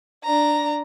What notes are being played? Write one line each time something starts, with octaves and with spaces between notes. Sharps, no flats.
D4 A#5